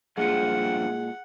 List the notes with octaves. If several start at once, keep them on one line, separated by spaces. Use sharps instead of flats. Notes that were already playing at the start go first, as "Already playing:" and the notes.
G2 A#2 F3 G#3 G#4 F#5 C#7